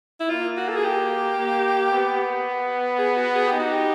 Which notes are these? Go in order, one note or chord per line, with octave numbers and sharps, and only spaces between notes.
E4
A#3 F4
F#4
A4
G#4
G4
A#3
B3
G#4
F#4
G#4
G4
D#4
F#4
G4